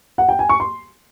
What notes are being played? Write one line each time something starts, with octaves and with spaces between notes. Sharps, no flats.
F#5
G5
G#5
C#6
C6